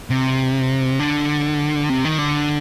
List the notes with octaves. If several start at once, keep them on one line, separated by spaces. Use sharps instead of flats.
C3
D3
C3
D#3
D3